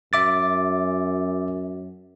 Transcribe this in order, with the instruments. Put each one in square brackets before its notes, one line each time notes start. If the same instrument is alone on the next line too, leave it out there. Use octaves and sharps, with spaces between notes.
[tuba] F#2 [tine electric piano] E5 D6 A6